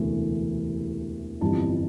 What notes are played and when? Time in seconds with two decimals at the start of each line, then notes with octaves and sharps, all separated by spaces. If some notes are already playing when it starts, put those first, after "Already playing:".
Already playing: E1 D2 C3 E3 A3
1.41 G1 F2 E3 G3 A5